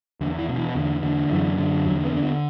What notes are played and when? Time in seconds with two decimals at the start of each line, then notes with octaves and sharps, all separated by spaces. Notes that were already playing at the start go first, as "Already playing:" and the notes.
0.21 E2 D3
0.39 E3
0.49 B2
0.58 E3
0.75 E2 D3
1.03 D3
1.31 F#2 E3
1.58 D3
1.86 E2 F#3
2.05 B3
2.13 D3 D4
2.22 B3